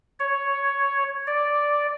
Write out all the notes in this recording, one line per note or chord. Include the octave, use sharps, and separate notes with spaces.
C#5
D5